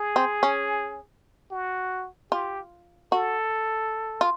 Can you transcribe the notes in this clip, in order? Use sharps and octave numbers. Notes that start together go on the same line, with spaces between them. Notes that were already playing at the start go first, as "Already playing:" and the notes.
Already playing: G#4
C4
C#4
F#4
F4 G4
F#4 A4
F4